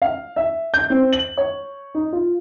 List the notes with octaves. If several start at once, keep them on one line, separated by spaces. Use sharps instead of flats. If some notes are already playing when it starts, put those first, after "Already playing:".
F5
E5
G6
C4
F#7
C#5
D#4
F4